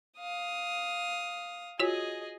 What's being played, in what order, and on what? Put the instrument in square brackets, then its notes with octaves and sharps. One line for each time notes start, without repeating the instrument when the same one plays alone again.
[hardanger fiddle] F5 D#6
[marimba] F4 F#4 C#5 [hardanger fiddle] G#4 D#5